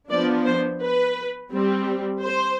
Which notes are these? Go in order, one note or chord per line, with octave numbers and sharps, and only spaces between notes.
F3 B3 D4 D5
C5
B4
G3 C4
C5